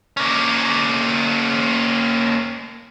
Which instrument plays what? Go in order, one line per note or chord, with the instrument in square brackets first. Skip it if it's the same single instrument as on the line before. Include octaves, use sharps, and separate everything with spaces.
[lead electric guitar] A#3 C#4